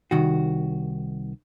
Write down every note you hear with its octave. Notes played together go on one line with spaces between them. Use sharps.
C2 D#3 F#4